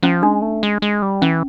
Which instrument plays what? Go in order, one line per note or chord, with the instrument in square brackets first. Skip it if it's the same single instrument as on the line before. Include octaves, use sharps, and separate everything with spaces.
[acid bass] F3 [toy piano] C#4
[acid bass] G#3 [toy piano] D4
[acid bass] A3
G#3
G#3
G3
[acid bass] E3 [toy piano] C#4